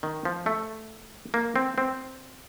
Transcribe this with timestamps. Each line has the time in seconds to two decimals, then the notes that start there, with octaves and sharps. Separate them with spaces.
0.03 D#3
0.25 F3
0.46 A3
1.34 A#3
1.56 C4
1.78 C4